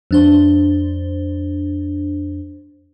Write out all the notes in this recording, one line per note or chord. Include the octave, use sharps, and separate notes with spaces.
F2 D4 C5